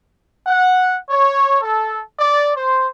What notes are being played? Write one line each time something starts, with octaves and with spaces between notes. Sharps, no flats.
F#5
C#5
A4
D5
C5